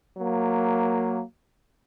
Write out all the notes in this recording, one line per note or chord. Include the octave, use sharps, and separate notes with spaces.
F#3 A#3